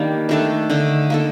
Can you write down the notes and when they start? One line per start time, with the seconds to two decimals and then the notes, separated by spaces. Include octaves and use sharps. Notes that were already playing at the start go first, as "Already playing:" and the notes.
Already playing: D#3 G3 A#3 D4
0.29 D#3 A3 D4 A4
0.70 D3 A3 D#4
1.10 A#3 D#4 A4